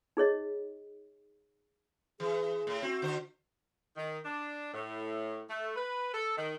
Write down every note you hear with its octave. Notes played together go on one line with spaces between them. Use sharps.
D#4 G#4 C#5 D#5
E3 G#4
A2
C4 F#4
D3 C5
D#3
D4
A2
A3
B4
A4
D#3